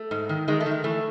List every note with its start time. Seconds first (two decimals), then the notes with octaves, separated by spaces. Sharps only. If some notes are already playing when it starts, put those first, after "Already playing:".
Already playing: A3
0.11 G#2
0.29 D#3
0.48 D#3 G#3
0.60 A3
0.66 D#3
0.71 G#3
0.84 E3 A3